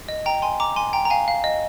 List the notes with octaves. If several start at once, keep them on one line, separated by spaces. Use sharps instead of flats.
D#5
G5 A#5
G#5 C6
A#5 D6
G#5 C6
G5 A#5
A#5
F5 G#5
F5
D#5